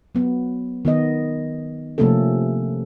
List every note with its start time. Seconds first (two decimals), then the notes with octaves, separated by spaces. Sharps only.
0.15 F#3 B3
0.85 D#3 B3 D#5
1.98 C3 F3 A3 A#3 C#4 A4